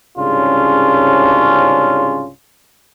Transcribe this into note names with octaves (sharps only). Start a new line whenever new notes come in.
C2 G#2 C#3 C#4 D4 F4